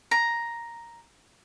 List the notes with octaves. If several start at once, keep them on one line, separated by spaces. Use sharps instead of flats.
A#5